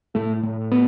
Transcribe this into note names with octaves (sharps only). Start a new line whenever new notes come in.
A2 A3
A2
B3